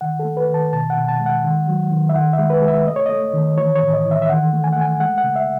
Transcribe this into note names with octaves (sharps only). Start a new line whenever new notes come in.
D#3 F#5
A4
A3
B4
D#3
A5
B2 A5
F#5
B2
A5
G#3
F#5
D#3
F#3
D#3
E5
D#3 F#5
E5
G#3
B4
G#3
E5
A3 D#5
C#5
A3 D#5
D#3
E3 C#5
C#5
A2
D#5
E3
E5
E5
D#3 F#5
A3
G#5
A3 F#5
G#5
G#3 F#5
F#5
C#3
E5